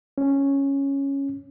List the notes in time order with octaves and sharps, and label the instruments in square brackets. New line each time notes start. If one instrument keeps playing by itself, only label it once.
[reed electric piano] C#4